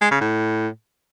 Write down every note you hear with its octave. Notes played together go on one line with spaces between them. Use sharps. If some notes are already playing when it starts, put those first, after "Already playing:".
G#3
C#3
A2